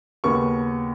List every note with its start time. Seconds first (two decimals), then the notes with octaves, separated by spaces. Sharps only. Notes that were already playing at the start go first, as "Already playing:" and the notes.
0.24 D#2 C#3 B3 C#6